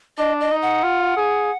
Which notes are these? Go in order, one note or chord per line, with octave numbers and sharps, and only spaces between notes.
D4 D#5
D#5
D#4
F#5
F4
G#4